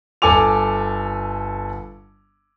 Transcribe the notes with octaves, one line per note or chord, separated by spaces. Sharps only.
G1 A4 G#5 D6 F7